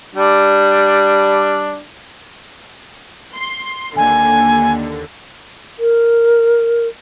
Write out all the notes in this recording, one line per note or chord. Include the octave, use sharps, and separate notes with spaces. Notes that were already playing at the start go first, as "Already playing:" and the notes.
G3 D4
C6
D#2 D3 G#5
A#4